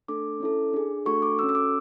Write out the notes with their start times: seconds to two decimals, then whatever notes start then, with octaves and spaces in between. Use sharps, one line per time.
0.08 A3 D4 A4 D6
0.40 C#4 E4 A4
0.73 D4 G#4
1.06 A3 D4 F#4 A4 C#6
1.22 D6
1.38 C#4 F#4 A4 E6
1.49 E6
1.55 D6